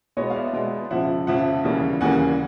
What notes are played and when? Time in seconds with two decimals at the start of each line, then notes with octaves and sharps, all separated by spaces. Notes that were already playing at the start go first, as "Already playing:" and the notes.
0.17 B2 G#3 B3 C#5 D#5
0.30 F5
0.36 D5 E5
0.53 B2 G#3 B3
0.91 F2 C#3 F3 E5 F#5
1.27 F2 C#3 F3 E5 F#5
1.64 D#2 C#3 E3 G3 A#3
2.01 D#2 C#3 E3 G3 A#3 F#5 G#5